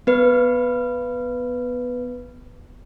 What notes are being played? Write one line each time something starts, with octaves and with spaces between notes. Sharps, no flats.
B3 B4